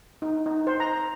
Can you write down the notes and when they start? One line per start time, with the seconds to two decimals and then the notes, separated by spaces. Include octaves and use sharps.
0.22 D#4
0.46 D#4
0.67 C5
0.80 A#5